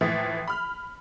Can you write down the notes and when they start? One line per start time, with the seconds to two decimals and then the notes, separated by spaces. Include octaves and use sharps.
0.01 A2 E3 F3
0.48 B5 F6